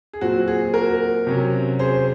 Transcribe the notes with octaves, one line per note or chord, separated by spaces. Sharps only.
G#4
A#2 F#3 C4 F#4
G#4
F#4 A#4
C3 F#3 C#4
G#4 C5